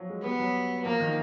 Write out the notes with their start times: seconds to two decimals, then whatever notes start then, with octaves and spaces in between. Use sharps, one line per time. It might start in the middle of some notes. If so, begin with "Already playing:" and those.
Already playing: F3 F#3
0.09 G#3
0.24 G3 B3
0.40 F#3
0.85 F3 A#3
1.00 D#3